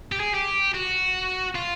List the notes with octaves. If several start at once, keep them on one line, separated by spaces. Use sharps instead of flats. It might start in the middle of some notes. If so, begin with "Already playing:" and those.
G4
G#4
G4
F#4
F4